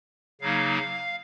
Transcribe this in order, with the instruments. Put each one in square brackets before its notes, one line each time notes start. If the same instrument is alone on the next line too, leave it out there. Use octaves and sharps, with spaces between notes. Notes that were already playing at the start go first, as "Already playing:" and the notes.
[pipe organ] C#3 F#3 A#3 D#4 F5